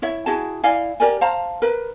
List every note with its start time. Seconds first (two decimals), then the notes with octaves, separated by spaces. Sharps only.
0.02 E4 C#5 E5
0.26 E4 F#4 G#4 A5
0.64 E4 D5 F5 G#5
1.00 G4 A#4 D5 G#5
1.21 C5 F5 A5 A#5
1.62 A#4 B4